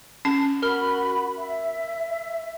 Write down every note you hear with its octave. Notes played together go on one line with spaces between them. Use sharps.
C#4 A5
F#4 A#4 B5 F6 G7
E5